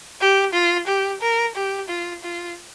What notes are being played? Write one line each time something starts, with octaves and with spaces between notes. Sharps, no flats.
G4
F4
G4
A#4
G4
F4
F4